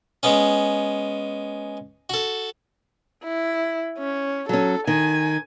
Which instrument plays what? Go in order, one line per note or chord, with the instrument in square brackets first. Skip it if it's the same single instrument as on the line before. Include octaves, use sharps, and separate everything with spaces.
[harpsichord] G#3 B3 C#4
F#4 A4
[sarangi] E4
C#4
[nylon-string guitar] F#3 C#4 [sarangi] A4
[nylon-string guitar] D#3 [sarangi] G#5